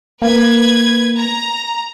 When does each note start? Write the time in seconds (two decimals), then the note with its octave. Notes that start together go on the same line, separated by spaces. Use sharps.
0.22 A#3 B4 G#6
1.18 A#5